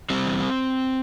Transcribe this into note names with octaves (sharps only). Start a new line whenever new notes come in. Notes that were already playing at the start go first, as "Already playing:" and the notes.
G3 C4
E2